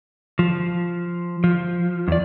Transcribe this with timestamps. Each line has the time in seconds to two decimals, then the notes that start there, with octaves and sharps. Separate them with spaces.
0.39 F3
1.44 F3
2.08 E2 D5